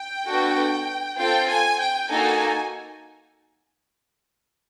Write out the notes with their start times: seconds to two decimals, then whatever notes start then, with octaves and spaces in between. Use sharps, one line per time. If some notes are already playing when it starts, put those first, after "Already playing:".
Already playing: G5
0.26 B3 D4 F#4 A4
1.18 C4 F4 A4 G5
1.49 G#5
1.80 G5
2.09 A#3 D#4 F#4 A4 G#5